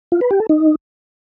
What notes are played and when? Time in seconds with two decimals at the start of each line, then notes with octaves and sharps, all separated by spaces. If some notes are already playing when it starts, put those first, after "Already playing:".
0.12 F4
0.21 B4
0.31 G4
0.40 A4
0.49 D#4